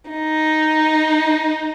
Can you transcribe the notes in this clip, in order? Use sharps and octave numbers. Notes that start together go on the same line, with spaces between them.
D#4